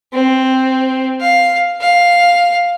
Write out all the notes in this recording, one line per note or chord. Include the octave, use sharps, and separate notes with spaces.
C4
F5
F5